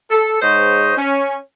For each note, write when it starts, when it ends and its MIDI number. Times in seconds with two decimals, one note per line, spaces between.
0.11 0.37 69
0.42 0.93 44
0.42 0.93 56
0.42 0.93 72
0.42 0.93 73
0.42 0.93 75
0.97 1.35 61